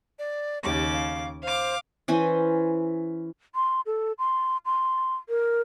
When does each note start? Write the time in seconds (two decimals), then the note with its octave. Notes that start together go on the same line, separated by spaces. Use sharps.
0.19 D5
0.64 D#2 C#3 G4 D6
0.93 F5
1.43 C5 F5 D6
2.08 E3 C#4 C5 G#5
3.55 C6
3.86 A4
4.19 C6
4.65 C6
5.29 A#4